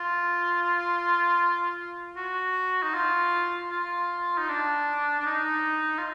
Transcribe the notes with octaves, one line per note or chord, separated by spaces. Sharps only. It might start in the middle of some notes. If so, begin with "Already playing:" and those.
Already playing: F4
F#4
D#4
F4
F4
D#4
D4
D4
D#4
F4